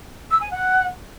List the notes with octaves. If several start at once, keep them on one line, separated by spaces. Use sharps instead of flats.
E6
G#5
F#5